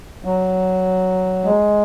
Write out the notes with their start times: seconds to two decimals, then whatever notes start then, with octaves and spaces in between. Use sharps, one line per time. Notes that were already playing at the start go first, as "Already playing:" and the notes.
0.25 F#3
1.44 G#3